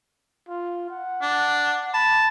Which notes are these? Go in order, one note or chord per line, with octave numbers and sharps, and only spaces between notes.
F4
F#5
D4
A5 B5